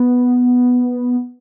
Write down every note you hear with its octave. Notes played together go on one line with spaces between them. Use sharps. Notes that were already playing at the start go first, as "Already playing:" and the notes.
Already playing: B3